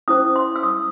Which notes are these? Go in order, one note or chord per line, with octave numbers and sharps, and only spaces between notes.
C#4 E4 C5 D#6
C6
E6
D#6